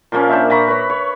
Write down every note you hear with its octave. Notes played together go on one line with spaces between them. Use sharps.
A#2 F3 A#3 C#4
D4 C5 E5
A#2 A#5 B5 C#6
B4 C#5
C#5